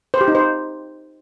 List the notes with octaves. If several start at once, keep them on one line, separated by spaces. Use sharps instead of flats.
C5
G4
D#4
C5